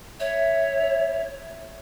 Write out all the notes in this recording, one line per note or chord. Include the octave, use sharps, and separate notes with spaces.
C#5 E5